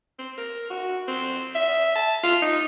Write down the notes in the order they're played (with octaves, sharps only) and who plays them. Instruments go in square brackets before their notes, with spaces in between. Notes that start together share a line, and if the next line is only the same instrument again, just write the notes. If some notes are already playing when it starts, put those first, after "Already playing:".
[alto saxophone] C4
A#4
F#4
C4
E5
A5
F4
D#4